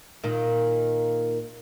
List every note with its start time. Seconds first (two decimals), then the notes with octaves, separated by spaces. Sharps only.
0.24 A#2 D#3